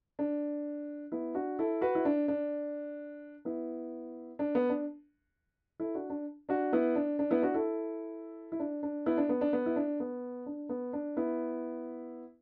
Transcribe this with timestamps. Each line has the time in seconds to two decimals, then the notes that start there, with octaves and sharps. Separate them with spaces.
0.19 D4
1.12 B3 E4
1.34 D4 F#4
1.59 E4 A4
1.81 F#4 B4
1.95 E4
2.05 D4
2.28 D4
3.45 B3 E4
4.39 D4
4.55 B3
4.69 D4
5.80 E4 A4
5.95 D4 F#4
6.10 D4
6.49 D4 F#4
6.73 B3 E4
6.96 D4
7.19 D4
7.31 B3 E4
7.42 D4 F#4
7.54 E4 A4
8.52 E4
8.60 D4
8.83 D4
9.06 B3 E4
9.17 D4
9.29 B3
9.41 D4
9.53 B3
9.66 E4
9.76 D4
10.00 B3
10.46 D4
10.69 B3
10.93 D4
11.17 B3 E4